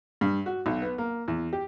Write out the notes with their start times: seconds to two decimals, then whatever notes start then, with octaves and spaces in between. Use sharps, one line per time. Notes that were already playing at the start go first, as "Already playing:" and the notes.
0.21 G2
0.46 F#4
0.66 B1
0.82 B3
0.98 A#3
1.28 E2
1.53 G4